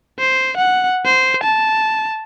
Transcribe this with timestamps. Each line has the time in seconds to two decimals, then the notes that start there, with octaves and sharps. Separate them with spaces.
0.19 C5
0.57 F#5
1.06 C5
1.43 A5